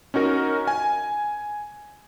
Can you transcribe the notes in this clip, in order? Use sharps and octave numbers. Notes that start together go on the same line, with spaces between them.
C#4 D#4 F#4 A#4
G#5